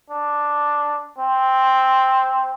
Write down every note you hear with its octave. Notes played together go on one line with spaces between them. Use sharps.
D4
C4